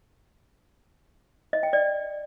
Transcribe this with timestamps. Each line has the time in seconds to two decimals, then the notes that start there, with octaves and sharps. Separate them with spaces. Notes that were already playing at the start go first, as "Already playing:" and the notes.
1.53 D#5
1.63 G5
1.73 D5